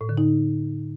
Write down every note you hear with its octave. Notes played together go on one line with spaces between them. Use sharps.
A2
D3
D#4